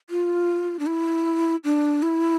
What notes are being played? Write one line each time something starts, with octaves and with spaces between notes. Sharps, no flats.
F4
D4
E4
D4
E4